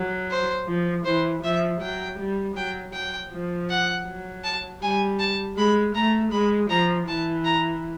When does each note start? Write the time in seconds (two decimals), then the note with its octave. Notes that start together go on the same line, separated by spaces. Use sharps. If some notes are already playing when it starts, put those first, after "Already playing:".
Already playing: F#3
0.30 C5
0.67 F3
1.05 E3 C5
1.43 F3 E5
1.81 F#3 G5
2.19 G3
2.56 F#3 G5
2.93 F#3 G5
3.31 F3
3.69 F#5
4.06 F#3
4.44 A5
4.82 G3 G#5
5.19 A5
5.57 G#3 B5
5.95 A3 A#5
6.32 G#3 B5
6.70 F3 A#5
7.08 E3 A5
7.45 A#5